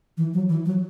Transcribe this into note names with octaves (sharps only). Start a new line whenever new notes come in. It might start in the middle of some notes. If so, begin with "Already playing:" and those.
E3
F#3
E3
F#3